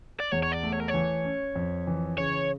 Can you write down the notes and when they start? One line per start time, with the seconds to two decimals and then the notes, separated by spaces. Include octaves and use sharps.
0.20 D5
0.32 E2 C#5
0.43 C#5
0.52 D5
0.63 A3
0.73 C#5
0.80 A#4
0.88 C#5
0.94 E3
1.25 C#4
1.56 F2
1.87 E3
2.18 C#3 C#5